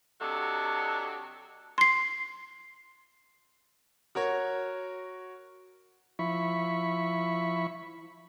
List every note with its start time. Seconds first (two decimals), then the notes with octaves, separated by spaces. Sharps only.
0.21 C3 F#3 D4 F#4 A4 D#5
1.78 C6 C7
4.15 F#4 A#4 C#5
6.19 F3 E4 B5 C#6